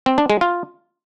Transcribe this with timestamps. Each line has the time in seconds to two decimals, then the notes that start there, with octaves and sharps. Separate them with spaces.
0.06 C4
0.18 D4
0.30 G#3
0.41 F4